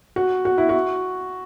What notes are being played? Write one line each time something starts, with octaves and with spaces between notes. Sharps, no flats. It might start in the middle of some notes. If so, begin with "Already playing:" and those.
F#4
F#4
E4
F#4